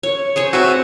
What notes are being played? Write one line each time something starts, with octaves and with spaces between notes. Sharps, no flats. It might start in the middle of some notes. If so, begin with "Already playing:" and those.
C#5
G#4 C5 C#5
C4 F#4 B4 E5